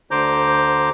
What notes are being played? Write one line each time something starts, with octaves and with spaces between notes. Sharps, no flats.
D2 D3 C5 A#5 D6 G6